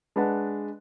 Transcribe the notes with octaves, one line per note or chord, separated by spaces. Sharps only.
G#3 D4 B4 F#5 A5